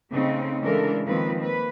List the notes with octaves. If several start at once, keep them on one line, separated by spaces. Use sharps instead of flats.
C#3 A3 C4 C#4 D#4
C#3 E3 G#3 D4 A4 A#4
D#3 F3 G#3 A#3 C4 B4
A#3 B4